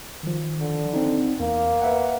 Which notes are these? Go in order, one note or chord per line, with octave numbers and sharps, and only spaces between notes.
D#3 F3
D3
C4 D#4
E2 A#3
B4 E5 F#5